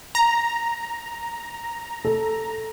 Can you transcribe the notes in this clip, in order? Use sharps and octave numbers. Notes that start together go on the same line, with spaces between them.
A#5
A4